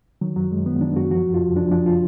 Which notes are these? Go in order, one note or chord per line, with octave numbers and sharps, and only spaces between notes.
D#3 F#3
F#2 F#3
F#2 G#3
D#3 B3
D#3 D4
F#2 F#4
F3 F#4
F2
F4
F2
F3 D4
F3 D4
F4